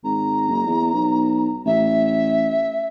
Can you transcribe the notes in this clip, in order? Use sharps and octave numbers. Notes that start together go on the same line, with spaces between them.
G#1 A#5
F#1
E2
B1
A1 E5